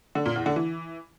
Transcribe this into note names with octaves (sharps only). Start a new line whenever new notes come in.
D3
A#2
E2
D3
E3